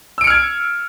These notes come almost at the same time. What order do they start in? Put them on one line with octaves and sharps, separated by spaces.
E6 D7 C#7 F6 G#6